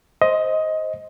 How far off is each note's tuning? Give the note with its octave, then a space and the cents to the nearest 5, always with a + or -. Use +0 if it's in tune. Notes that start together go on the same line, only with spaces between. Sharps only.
C5 +0 D#5 +15